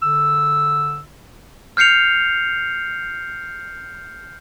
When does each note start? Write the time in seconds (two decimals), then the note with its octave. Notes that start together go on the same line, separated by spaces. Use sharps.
0.02 D3 E6
1.77 F6 G6 C7 C#7 F7